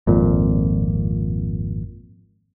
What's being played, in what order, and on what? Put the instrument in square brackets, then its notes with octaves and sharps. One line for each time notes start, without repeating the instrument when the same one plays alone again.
[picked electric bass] G#1 F2 A#2